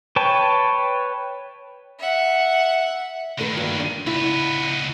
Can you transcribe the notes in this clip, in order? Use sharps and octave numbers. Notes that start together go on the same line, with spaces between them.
B4 C#5 G5 A5
E5 F#5
D3 D#3 A3 A#4 B4
G2 A#3 F#4
D4
C#2 B3 E4